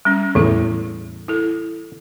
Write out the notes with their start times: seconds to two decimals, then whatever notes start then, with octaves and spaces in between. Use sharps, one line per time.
0.05 G3 C#4
0.35 E2 A2 E3 E4
1.28 E4 A4